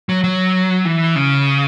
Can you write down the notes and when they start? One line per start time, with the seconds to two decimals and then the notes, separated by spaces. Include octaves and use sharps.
0.09 F#3
0.24 F#3
0.85 E3
1.16 C#3